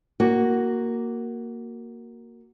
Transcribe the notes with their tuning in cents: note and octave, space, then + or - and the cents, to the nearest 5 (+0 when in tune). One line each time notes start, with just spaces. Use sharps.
A#3 +0 F#4 +5